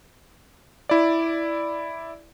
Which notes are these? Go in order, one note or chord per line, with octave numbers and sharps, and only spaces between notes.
E4 D5